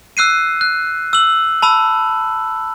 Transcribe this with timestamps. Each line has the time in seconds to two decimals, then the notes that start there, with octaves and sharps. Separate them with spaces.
0.17 E6 F#6 C7 D#7
0.61 F#6
1.13 E6 F#7
1.62 A5 B5 E6